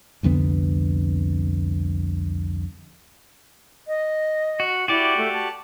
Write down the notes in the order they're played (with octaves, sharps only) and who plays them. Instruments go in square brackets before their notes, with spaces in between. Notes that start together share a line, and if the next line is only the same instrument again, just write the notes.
[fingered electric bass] C2 F2 D3 B3
[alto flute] D#5
[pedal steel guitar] F#4
[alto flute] E4 [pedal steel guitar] F#4 G4 D5
[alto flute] A3
A5